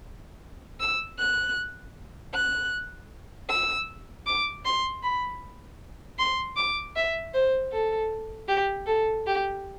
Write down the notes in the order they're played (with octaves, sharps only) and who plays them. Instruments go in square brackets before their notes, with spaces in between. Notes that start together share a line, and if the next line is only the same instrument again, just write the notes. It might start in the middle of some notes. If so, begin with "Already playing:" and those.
[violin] E6
F#6
F#6
E6
D6
C6
B5
C6
D6
E5
C5
A4
G4
A4
G4